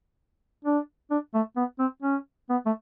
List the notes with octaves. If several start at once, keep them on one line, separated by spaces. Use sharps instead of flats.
D4
D4
A3
B3
C4
C#4
B3
A3